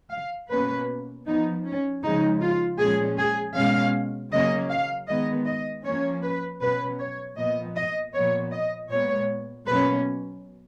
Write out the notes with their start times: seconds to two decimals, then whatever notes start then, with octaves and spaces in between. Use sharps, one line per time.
0.11 F5
0.49 B2 A#3 C#4 B4
1.26 F3 B3 D#4
1.65 C#4
2.03 C#3 F3 G#3 D#4
2.41 F4
2.79 A#2 F3 G#3 C#4 G#4
3.18 G#4
3.55 B2 G#3 C#4 F5
4.32 C#3 F#3 A#3 C#4 D#5
4.70 F5
5.08 D#3 G#3 B3 D#5
5.46 D#5
5.84 F3 A#3 C#4 C#5
6.23 B4
6.61 B2 F#3 C#4 B4
7.00 C#5
7.37 A#2 F3 B3 D#5
7.75 D#5
8.13 A#2 F3 B3 C#5
8.51 D#5
8.90 A#2 G#3 B3 C#5
9.66 B2 F#3 A#3 C#4 B4